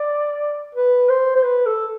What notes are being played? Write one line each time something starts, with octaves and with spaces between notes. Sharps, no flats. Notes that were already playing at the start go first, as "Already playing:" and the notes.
Already playing: D5
B4
C5
C5
B4
A4